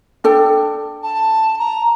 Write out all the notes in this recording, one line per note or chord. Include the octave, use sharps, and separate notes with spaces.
D4 A4 G5
A5
A#5